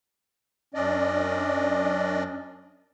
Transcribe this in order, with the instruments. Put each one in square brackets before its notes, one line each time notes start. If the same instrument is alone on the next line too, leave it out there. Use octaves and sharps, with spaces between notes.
[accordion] F#2 C#4 D4 D5 D#5